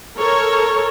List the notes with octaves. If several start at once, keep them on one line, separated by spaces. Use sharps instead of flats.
A4 A#4 C#5